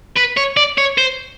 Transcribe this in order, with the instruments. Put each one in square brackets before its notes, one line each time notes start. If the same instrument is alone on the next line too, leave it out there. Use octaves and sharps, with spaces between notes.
[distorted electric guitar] B4
C#5
D5
C#5
C5